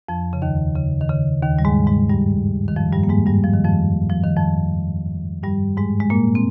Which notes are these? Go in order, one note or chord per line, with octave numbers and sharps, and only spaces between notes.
F2 F3
C#3
D#2 D#3
C#3
D#3
C#3
D#2 D#3
G3
G#2 G#3
G#2 G#3
G2 G3
D#3
F2 F3
G2 G3
A#3
G#2 G#3
G2 G3
F3
D#3
F2 F3
F3
D#3
F2 F3
G2 G3
G#2 G#3
G#3
A#2 A#3
C4